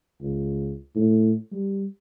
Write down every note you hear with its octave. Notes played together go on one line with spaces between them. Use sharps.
C#2
A2
G3